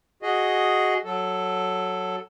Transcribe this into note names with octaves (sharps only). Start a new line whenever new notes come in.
F#4 G#4 D#5
F#3 A4